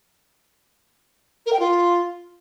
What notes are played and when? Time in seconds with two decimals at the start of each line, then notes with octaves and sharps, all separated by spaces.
1.46 A#4
1.53 G5
1.60 F4